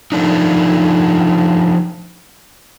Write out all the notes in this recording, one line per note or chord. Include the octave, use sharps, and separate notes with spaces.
F3 A3 D4 D#4